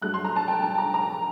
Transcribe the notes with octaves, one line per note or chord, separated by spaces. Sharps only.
G2 F#3 A3 F#6
C6
A#5
A5
G5
A5
A#5
A#5